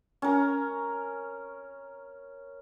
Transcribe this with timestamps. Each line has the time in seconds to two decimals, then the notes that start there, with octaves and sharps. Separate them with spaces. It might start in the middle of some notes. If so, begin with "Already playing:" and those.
0.22 C#4 A#4